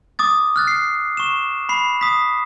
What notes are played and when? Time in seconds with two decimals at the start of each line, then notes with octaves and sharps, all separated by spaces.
0.19 D6 D#6 A6
0.56 F6 F#6 A6
0.68 C7
1.17 C#6 E7
1.69 B5 C7
2.01 D#6 B6